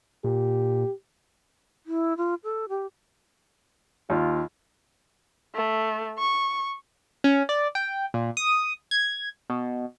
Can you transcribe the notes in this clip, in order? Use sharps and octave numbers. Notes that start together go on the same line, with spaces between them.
A#2 G4
E4
F4
A4
G4
D#2 F4
A3
C#6
C#4
D5
G5
A#2
D#6
G#6
B2